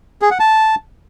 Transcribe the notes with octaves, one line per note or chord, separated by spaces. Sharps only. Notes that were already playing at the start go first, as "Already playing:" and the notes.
G#4
F#5
A5